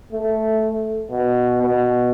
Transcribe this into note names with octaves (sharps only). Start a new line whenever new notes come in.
A3
B2
B2